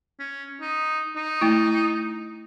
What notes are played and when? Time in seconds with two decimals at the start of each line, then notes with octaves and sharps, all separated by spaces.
0.19 C#4
0.61 D#4
1.16 D#4
1.41 A3 E4